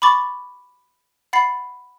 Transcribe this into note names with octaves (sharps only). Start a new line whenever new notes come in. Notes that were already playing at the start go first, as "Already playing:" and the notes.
B5 C#6 D6 A6
F#5 B5 A6 C7